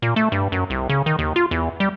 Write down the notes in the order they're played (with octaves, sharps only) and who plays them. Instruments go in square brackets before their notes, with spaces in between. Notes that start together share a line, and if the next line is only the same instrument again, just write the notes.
[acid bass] A#2
A3
G2
F#2
C2
C#3
D#3
D#2
F4
E2
G3